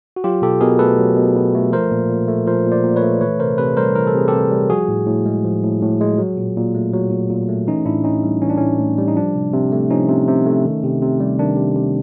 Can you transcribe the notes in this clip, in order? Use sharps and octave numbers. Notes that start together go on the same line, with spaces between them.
F#4
F#3 F4 G4
B2 G4 A4
B2 G#4 A#4
A3 A4 B4
F#3
B2
B2
A3
F3 A#4 C5
A#2
A#2
A3
F3 A#4 C5
A#2
C5 D5
A#2
B4 C#5
A3
E3 B4 C#5
C3 A#4 C5
C3 A4 B4
G3 A#4 C5
E3 A#4
A4
C3 G#4
C3 G4 A4
G3
F3 F#4 G#4
A2
A2
G#3
F3
A2
A2
G#3
F#3
A#2
A#2
A3
F#3
A#2
A#2
A3
E3 C#4 D#4
A2 D4 E4
A2 C#4 D#4
G3
E3 C#4
D4
A2 C#4
A2
G3
D#4
F3 D4
C3
C3
A3
F3 C#4 D#4
C3
C3
A3
D#3
C3
C3
G3
D#3 D4
C3
C3